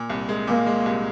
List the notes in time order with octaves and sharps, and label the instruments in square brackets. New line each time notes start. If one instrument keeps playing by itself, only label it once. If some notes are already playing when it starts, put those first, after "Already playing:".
Already playing: [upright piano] A#2
C2
G#3
[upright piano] A#2 [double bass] A#3
[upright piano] G#3
C2